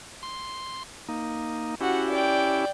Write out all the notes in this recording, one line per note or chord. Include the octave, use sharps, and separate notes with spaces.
C6
A#3 D#4
C#4 E4 F#4 G4 F#5
D5 G5